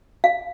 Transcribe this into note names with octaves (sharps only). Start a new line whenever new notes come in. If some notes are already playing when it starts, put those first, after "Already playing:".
F5